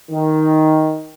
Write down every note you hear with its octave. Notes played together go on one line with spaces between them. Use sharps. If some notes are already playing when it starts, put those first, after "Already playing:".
D#3